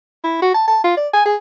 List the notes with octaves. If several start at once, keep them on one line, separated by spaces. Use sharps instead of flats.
E4
F#4
A5
A5
F4
D5
G#5
G#4